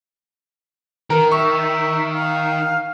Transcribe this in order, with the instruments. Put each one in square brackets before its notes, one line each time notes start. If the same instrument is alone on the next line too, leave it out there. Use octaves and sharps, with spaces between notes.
[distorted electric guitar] D#3 [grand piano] A#4
[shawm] E5 [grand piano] C#6
[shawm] F5